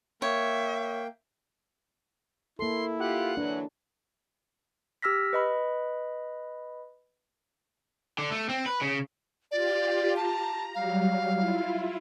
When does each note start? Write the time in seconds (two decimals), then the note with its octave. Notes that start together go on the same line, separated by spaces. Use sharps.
0.22 A#3 C#5 E5 G5
2.59 A#3 E4 A4 C6
2.99 F4 G4 F#5
3.37 E3 F#3 D4 B4
5.02 G4 E6 F6 A#6 B6
5.33 B4 D#5 B5
8.18 D3
8.31 A3
8.49 C4
8.66 B4
8.81 C#3
9.51 F4 G4 D5
10.16 A5 A#5
10.75 F#3 G3 F5
11.36 E4 F4